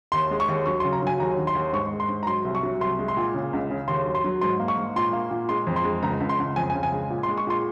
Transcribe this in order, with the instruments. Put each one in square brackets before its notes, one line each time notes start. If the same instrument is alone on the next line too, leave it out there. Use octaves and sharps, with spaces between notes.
[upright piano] D#2 C6
G#3
C#6
D#2
F#3 C#6
C6
C#3
A#5
F#3 G#5
D#2 A#5
D#3
C6
D#2
G#2 C#6
G#3
C6
G#2
A#5
F#3 C6
C2
C#6
F#3
C2 C6
G#3
C6
A#2
C#3
C#2
C#3
D#2 C6
F#3
C6
F#3
G#2 C6
A#3
C#6
G#2
A#2 C6
A#3
A#2
G#3 C6
F2
C6
G#3
C#2 A#5
C#2
C6
C#2
F2 G#5
G#5
C#3
G#5
G#3
A#2
C6
G#3
C#6
A#2 C6